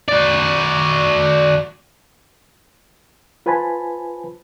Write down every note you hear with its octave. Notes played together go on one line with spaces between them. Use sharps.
F#4 D5
F4 B4 C5 G#5 A5 B5